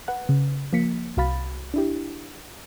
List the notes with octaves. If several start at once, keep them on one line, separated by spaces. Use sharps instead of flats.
B4 F#5 F#6
C#3
F3 A#3 B6 C#7
C2 F#4 F5 B5 A6
D4 E4 G4